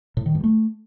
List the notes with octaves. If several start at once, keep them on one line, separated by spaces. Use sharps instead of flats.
A2
D#3
G2
A3